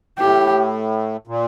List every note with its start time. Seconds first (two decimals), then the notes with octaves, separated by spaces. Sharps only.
0.19 A2 G4
1.27 A#2